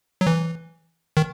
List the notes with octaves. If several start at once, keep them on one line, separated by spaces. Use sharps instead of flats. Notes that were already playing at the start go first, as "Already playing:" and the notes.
F#3
E3
D#3